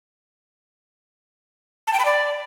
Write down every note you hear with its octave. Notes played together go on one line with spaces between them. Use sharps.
A5
G5
B5
D5